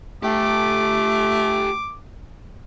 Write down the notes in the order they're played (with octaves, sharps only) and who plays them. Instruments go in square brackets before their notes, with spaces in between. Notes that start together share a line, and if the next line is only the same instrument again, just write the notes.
[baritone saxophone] A3 [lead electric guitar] G4 A4 [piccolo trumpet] D6